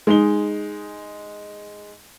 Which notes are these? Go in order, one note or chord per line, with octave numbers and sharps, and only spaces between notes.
G#3 D#4 G7